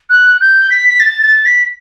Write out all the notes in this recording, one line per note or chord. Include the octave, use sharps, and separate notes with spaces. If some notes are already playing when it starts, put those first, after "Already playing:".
F#6
G6
B6
A6
A6
B6